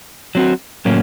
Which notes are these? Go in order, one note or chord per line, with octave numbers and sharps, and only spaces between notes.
F#3 C4 F#4
A2 F#3 A#3 C#4